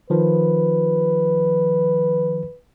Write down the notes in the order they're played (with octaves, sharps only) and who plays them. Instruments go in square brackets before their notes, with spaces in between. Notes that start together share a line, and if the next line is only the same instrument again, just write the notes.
[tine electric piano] D#3 F3 [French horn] B4